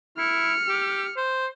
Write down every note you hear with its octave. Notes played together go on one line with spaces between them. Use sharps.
E4 F6 C#7
G4
C5